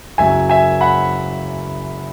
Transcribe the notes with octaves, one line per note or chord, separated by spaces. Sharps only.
F#1 F#2 F#3 E5 G#5
E5 G#5
F#5 B5